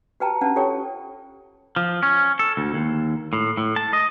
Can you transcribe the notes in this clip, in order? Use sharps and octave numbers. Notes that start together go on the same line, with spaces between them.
F#4 G4 B4 G5 A5 A#5
C#4 D4 B4 F#5 A5
F4 G4 A4 C#5 G5 C#6
F3
C#4
A4
D2
D#2
A2
A2
A5
D#5